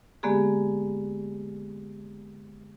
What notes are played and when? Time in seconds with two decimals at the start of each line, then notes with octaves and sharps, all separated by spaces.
0.23 D3 G#3 A#3 B3 G4 G#4